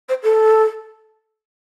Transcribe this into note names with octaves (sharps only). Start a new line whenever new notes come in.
C5
A4